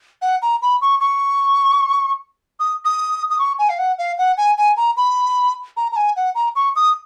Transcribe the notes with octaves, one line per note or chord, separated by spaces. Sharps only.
F#5
A#5
B5
C#6
C#6
D#6
D#6
D#6
C#6
G#5
F5
F#5
F5
F#5
G#5
G#5
A#5
B5
A#5
A#5
G#5
F#5
A#5
C#6
D#6